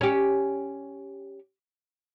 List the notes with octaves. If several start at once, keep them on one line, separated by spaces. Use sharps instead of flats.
C#4 G4